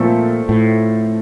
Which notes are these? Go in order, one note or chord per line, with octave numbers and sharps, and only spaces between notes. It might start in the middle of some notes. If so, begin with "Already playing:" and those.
Already playing: A#2 F3 A3 C4 A4
A2